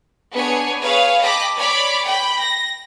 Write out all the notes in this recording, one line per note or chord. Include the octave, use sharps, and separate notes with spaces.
B3 D4 G#4 C#5 G#5
G#4 B4 C#5 F5
D#5 G5 A5 B5 D6
C#5 D5 B5 D6
G5 B5
A#6